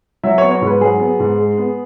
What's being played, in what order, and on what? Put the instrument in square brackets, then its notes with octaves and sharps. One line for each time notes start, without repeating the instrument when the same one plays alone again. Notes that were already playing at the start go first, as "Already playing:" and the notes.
[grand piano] F#3 E5
B3 C#5
C#5
G#2
B4
F#3 G#4
B3
G#2
G#3
B3